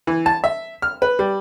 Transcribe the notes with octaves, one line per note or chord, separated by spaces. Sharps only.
E3
A5
E5
F6
B4
G3